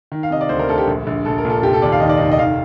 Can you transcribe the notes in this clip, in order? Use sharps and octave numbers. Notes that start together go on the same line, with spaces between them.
D#3
F5
C3 D#5
D5
D2 C5
A#4
D2 A4
G4
A#1
A#1
A#1 A4
A#4
A#2
A4
F1 G4
A4
D#2 D5
F5
D#3 D#5
D5
F1 D#5
D#5
D#3 F5